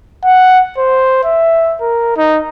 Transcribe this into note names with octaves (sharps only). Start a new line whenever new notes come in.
F#5
C5
E5
A#4
D#4